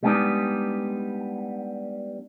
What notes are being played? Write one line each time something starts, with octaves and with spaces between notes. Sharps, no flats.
G3 G#3 B3 C4 D4 D#4